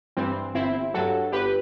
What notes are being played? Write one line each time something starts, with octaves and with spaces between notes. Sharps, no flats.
G2 E3 G3 C4
G1 C4 E4
G2 F#3 F#4 A4
G1 G4 B4